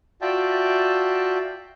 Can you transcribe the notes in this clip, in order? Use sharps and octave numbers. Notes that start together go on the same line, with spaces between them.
F4 F#4 D5 E5 G5 A5